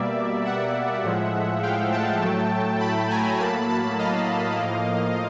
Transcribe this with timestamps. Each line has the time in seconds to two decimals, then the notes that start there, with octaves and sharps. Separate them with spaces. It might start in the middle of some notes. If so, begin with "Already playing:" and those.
Already playing: B2 G3 A#3 D5 E5
0.45 E5 F#5
1.04 A2 F3 G#3
1.63 F5 G5
1.92 G5 A5
2.21 A2 F#3 A3
2.81 A5 B5
3.10 G#5 A#5
3.40 A2 F#3 A#3 A5 B5
3.69 A5 B5
3.99 D#5 F5
4.58 A2 F3 A#3